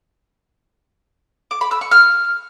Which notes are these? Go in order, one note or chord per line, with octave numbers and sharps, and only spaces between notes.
D6
B5
E6
C#6
F6